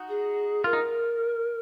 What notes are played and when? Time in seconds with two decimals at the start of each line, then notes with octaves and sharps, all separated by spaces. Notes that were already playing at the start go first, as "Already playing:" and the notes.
Already playing: D#4 F#4
0.09 G#4
0.64 F4 A#4
0.73 D#4